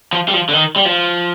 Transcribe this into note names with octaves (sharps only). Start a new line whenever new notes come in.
F3
G3
F3
D3
D#3
G3
F3